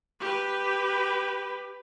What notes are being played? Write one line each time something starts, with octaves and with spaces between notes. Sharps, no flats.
G4 B4